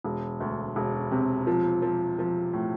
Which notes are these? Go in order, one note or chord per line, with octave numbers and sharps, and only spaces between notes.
E1
D2
E1
C3
F3
F3
F3
A2